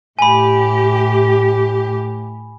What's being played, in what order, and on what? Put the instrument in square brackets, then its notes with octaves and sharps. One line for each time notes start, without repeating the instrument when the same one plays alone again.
[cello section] A2 G4 [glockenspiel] G#5 B5